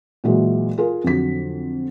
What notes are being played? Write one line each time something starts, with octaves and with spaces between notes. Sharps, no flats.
A#2 E3 F#3 G#3
F4 G#4 A#4
F2 D3 F#3 B6